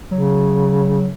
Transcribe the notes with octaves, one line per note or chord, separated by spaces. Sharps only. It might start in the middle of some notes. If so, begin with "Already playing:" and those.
C#3 F#3